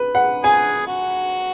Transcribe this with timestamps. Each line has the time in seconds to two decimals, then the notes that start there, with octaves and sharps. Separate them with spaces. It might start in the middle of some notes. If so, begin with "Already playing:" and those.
Already playing: B4
0.15 F#5
0.43 G#4 G#5
0.87 F#4